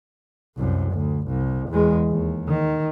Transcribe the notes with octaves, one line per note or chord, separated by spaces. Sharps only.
C2 F#2
D2
C2
E2 G#3
D#2
D#3